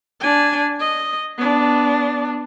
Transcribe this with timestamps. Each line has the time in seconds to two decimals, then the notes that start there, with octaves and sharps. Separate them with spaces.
0.21 D4 G#5
0.80 D#5
1.38 B3 D4